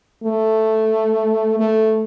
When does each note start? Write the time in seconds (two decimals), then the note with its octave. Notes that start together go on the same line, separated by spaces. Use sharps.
0.24 A3
1.60 A3